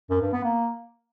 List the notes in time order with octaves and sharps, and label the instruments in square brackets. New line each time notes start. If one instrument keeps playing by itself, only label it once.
[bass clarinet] F#2
G2
B3
A#3